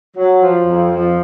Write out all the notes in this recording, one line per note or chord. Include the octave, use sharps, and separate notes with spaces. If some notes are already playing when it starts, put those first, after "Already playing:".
F#3
F3
F2
F3